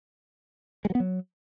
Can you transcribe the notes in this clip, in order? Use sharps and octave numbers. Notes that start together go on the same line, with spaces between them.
G#3
F#3
B3
F#3